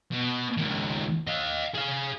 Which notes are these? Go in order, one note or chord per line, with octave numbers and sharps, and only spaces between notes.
B2
C#2 D#3
D#5 F5
G#4 F5